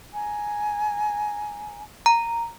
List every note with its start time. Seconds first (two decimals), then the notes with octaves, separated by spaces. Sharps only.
0.13 G#5 A#5
2.06 A#5